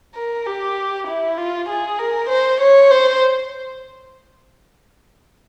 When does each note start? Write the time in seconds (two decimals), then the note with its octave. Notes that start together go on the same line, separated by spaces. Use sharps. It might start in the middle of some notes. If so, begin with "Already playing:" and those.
0.15 A#4
0.46 G4
1.07 E4
1.37 F4
1.69 G#4
1.99 A#4
2.29 C5
2.61 C#5
2.91 C5